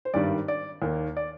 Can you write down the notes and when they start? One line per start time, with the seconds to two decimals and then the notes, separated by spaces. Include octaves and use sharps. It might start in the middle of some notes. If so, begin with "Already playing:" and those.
0.05 C5
0.14 G#1 G2 D#3 G3 D5
0.48 D5
0.82 D#2 D#3 A#3
1.17 D5